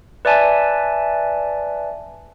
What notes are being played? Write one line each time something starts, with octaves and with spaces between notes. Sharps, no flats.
B4 D5 E5 G#5 A5